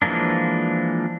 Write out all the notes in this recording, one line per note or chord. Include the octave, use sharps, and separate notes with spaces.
E3 F3 G#3 A#3 D4